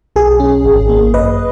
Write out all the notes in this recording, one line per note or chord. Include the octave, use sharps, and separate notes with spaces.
B1 G#4
C#4
G#1
A#3
F#2 B4 D#5